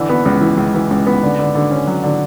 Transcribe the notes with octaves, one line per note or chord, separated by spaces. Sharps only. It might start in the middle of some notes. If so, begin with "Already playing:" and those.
Already playing: D3 E3
B3
C#2
E3
C#2
E3
C#2
B3
D3
D3
D3
C#4
F#3
D3